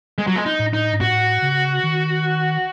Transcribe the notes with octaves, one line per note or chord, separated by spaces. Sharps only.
G#3
F#3
G#3
D#4
A2
D#4
G#2
A2 F#4
C#3
D#3